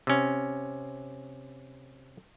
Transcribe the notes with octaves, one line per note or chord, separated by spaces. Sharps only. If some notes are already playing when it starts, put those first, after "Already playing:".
C3 C#4